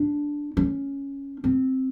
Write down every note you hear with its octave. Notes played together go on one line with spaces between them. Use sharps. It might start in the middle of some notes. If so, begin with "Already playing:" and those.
Already playing: D4
C#4
C4